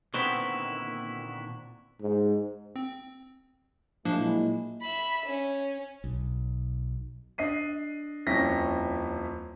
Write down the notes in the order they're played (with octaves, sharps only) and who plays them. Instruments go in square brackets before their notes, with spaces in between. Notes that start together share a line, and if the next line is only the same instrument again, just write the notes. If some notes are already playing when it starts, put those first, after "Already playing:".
[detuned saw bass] A#2 [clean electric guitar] D3 D#3 E4 [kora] B3 C4 [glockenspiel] C#6 B6
[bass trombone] G#2
[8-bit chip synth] C4
[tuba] A#2 [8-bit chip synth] F3 A#3 D4 [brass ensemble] F#3 G#3 E4
[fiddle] E5 B5
C#4
[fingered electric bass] B1
[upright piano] D4 D#5 C7 D#7
D#1 F2 C#4 E4 A#6 B6